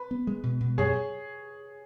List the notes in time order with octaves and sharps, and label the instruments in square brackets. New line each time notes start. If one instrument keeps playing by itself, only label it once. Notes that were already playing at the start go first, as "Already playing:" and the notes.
Already playing: [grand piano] B4
[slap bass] B3
G#3
B2
B2
[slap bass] F#2 [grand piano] G#4 C#5